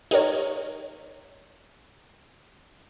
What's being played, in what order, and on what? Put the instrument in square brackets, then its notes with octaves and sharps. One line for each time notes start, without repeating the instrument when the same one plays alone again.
[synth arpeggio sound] D#4 G4 A#4 C#5